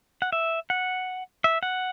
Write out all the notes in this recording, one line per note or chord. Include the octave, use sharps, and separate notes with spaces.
F#5
E5
F#5
E5
F#5